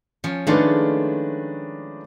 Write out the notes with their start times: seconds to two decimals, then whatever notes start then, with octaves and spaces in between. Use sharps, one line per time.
0.24 F3 C#4
0.47 D#3 G#3 A3 D4 F4 B4